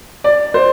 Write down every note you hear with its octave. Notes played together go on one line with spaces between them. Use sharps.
D5
C5